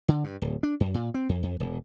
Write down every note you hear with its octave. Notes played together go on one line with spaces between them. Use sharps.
D3
G2
D1
D4
F#2
A#2
C4
F2
F2
E1